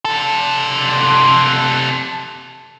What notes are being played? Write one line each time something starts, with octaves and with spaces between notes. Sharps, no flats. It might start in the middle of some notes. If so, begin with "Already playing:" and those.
C3 A4